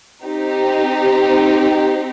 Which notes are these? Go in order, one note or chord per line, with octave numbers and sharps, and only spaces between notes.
C4 D#4 G4